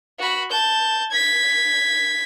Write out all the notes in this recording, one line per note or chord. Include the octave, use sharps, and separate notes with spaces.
F#4 B5
A5 G6
G#6 B6